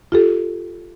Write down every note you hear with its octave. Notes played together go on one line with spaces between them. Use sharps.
F4 G4 A4